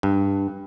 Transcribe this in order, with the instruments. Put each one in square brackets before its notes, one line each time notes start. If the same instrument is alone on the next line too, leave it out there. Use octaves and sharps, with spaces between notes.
[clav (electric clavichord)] G2